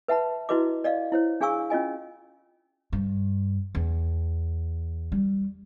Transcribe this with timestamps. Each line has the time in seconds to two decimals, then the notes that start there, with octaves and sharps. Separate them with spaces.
0.08 B4 E5 F#5 A5 B5
0.49 E4 F#4 B4 D#5 D6
0.84 D5 D#5 F5
1.12 E4 C5 C#5
1.41 D4 G#4 F5 G#5 C#6 E6
1.70 C#4 F4 D#5 G#5
2.92 G2
3.75 E2
5.12 G3